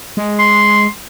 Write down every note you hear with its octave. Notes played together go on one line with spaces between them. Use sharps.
G#3
C6